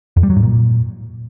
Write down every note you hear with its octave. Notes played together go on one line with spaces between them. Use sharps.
F2
G3
F#3
G#2
A#2